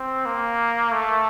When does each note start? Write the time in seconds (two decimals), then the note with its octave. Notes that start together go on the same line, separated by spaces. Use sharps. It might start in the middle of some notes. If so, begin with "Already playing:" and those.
Already playing: C4
0.26 A#3
0.93 A3